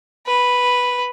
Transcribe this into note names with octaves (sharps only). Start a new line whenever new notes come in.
B4